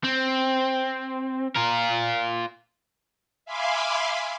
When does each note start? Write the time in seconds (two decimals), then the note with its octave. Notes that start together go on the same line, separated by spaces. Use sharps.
0.04 C4
1.56 F4 A#4
3.45 E5 F5 G#5 B5 C6 D6